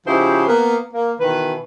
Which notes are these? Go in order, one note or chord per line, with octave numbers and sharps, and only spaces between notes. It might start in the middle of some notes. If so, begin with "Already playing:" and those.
C#3 F3 D#4 E4 G4 C5
A#3 B3
A#3
B2 D#3 E3 B4